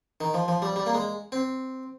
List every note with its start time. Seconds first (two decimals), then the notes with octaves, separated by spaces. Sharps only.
0.21 D#3
0.34 F3
0.48 F3
0.62 G3
0.76 G3
0.86 A#3
0.94 G#3
1.32 C4